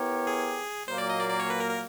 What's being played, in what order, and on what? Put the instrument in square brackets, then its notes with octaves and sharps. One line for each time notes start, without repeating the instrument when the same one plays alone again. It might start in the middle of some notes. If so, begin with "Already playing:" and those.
Already playing: [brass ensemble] B3 E4 G4 A#4 C#5
[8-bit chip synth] G#4
[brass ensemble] A#2 F#3 A#3 [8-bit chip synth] C5
[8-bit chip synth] D5
D#5
D5
D5
C#5
B4
A#4
A#4